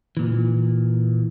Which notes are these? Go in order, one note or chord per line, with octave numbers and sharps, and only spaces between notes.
A#2 E3